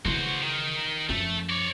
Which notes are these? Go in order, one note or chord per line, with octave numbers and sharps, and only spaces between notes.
C#3 E3 F#4 C5
D#3
F#2 F3 A3 A4
C#5 D5